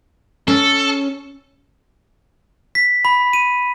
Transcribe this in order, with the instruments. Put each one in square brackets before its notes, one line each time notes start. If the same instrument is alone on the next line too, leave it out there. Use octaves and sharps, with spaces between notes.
[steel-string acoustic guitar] C#4 [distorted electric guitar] A4
[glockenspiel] B6
B5
D#7